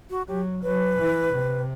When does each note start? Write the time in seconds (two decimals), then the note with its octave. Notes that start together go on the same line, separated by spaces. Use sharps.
0.10 F#4
0.28 F#3 G4
0.63 F#3 B4
0.98 E3
1.33 C3